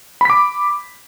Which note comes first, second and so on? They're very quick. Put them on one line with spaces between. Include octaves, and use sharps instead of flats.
B5 B6 D6